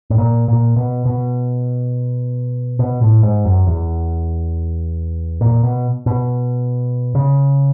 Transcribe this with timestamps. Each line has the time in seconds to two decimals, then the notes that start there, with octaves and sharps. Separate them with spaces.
0.10 A2
0.18 A#2
0.48 A#2
0.76 B2
1.06 B2
2.79 B2
3.01 A2
3.23 G#2
3.45 F#2
3.67 E2
5.41 A#2
5.63 B2
6.06 B2
7.15 C#3